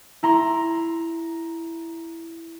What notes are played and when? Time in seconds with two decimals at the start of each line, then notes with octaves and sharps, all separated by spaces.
0.23 E4 A#5 C6